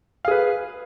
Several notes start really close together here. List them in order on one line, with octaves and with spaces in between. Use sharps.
F5 G#4 B4